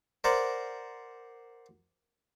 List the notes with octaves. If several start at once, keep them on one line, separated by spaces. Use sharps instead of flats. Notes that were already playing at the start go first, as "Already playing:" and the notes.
A#4 C5 D5 F#5